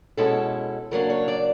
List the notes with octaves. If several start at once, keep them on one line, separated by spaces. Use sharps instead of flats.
B2 G#3 C#4 E4 A4
C#3 F#3 A#3 D4 A#4
C#5
D5